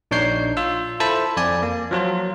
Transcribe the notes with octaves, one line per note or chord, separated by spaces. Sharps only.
A#1 D4 D#4 C#5 G6 C7
F4 E6
E4 A4 C5 A5 B5
F2 D5 G#5
A#3
F3 F#3 F4